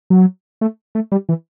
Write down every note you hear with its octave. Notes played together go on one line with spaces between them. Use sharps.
F#3
A3
A3
G3
E3